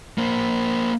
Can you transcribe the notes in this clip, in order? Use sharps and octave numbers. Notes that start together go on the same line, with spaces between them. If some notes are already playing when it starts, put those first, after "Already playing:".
A#3 C5